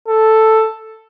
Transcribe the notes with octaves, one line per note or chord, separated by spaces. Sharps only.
A4